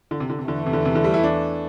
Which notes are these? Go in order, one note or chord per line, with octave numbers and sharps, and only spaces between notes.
D3
C3
D3
C3
E2 D3 E3 A3
C3
D3
C3
D3
G3
E4
D4